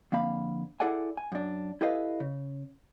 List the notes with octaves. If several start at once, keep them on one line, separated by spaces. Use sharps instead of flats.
F2 D3 A#3 F5 B5
E4 G#4 A4 D5 F#5 G#5
G#5
F#2 D4
E4 G4 A4 B4 D#5 F5
C#3